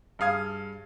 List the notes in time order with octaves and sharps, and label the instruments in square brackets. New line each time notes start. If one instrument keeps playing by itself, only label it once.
[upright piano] G2 G#4 F5 D#6 G#6